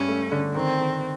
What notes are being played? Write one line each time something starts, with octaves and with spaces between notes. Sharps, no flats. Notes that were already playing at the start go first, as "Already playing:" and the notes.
Already playing: G2 C#4
A3
D3
D#3 C4
D#3